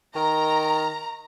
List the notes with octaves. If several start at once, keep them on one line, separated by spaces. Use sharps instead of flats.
D#3 A#5